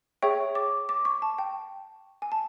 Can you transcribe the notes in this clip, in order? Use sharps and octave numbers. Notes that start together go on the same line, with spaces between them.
G#4 C#5 E5 G5 C#6
D6
D6
C#6
A5
G5
G#5
A5